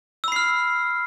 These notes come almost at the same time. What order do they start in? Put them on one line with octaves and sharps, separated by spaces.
E6 B5 C7 F6